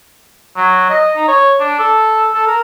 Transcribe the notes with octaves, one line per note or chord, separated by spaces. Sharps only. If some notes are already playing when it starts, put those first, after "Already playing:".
F#3
D#5
D#4
C#5
D4
A4
A4
A#4